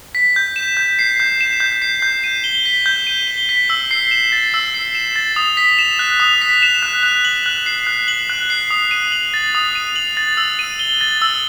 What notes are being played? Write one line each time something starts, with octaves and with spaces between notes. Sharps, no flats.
B6
G6
E7
G6
C7
G6
E7
G6
C7
G6
D#7
G7
B6
G6
D#7
G7
B6
E6
C7
E7
A6
E6
C7
E7
A6
D#6
B6
E7
F#6
D#6
B6
E7
F#6
F#6
F#7
F#6
C7
F#6
F#7
F#6
C7
D#6
D#7
F#7
A6
D#6
D#7
F#7
A6
E6
D#7
G7
A6
E6